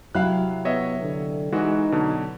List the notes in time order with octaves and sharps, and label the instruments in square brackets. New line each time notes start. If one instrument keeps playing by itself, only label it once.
[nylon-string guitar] C3 F#3 E4 [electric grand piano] F5 F#6
[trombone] B3 [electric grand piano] C#5 D#5 E5
[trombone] D3
[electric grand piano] E3 G#3 F#4 [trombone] D#4
[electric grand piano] B2 D3 F#3